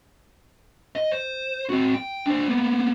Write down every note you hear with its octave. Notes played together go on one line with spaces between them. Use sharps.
D#5
C5
C4 F#4
G5
D4 C5
A#3 B3